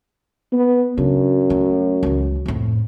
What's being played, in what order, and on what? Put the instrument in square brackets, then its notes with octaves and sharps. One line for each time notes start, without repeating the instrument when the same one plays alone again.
[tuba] B3
[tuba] F#2 [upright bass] C#3 D4
[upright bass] A3
C#2 E3
F2 A2